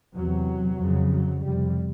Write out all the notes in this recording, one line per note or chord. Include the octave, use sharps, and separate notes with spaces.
E2 C3 F#3
F2 C#3
F#3
F2 C3 G3